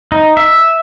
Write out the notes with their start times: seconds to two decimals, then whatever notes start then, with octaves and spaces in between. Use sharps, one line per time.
0.12 D#4
0.37 E5